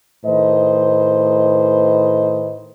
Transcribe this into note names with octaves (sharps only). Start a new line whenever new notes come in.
A2 D#3 B4 C5 D#5